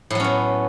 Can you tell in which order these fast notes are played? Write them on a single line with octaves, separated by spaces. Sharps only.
A2 F#3 C#4 B3